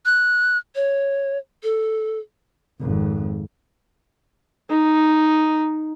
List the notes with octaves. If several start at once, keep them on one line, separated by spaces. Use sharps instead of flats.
F#6
C#5
A4
G#1 F2
D#4